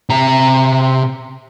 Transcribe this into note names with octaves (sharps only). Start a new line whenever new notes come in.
C3 A#5